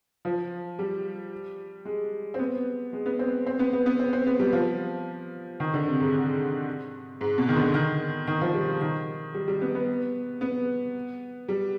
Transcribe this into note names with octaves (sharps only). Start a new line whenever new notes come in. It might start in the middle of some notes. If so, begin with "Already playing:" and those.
F3
G3
G#3
C4
B3
G#3
B3
C4
C4
B3
B3
B3
C4
C4
B3
G3
F3
D#3
D3
C3
G#2
G#2
B2
D#3
D3
D#3
D#3
F3
G3
D#3
G3
G3
B3
B3
B3
G3